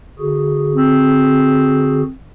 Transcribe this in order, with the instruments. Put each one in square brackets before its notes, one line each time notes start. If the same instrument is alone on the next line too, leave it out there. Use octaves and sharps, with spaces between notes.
[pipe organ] D3 F#4 G#4
[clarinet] C4